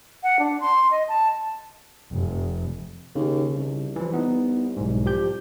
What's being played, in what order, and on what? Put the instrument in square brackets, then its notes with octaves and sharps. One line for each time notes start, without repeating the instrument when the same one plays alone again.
[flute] F#5
D4
C6
D#5
A5
[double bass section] F1
[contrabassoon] D#2 [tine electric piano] C#3
[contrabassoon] C2
[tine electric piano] E3 F3
B3 D#4
B1 G#2
F3 G4 G6